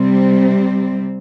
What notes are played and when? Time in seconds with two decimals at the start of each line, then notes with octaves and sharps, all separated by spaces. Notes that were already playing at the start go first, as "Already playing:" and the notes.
Already playing: C3 G3 C4